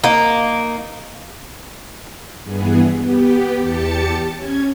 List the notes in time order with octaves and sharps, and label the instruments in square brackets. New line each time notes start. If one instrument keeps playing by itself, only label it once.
[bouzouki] A#3 D#4
[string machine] G2 E3 B3 G#4
B3 G4
E2 G4 A5 A6 C#7
C#4 G#6